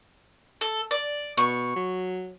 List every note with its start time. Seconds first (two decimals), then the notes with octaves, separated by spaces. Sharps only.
0.61 A4
0.91 D5
1.38 B2 C#6
1.76 F#3